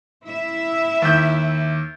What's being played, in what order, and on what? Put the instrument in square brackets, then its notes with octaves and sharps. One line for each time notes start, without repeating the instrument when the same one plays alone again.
[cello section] E4 E5
[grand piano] D#2 G6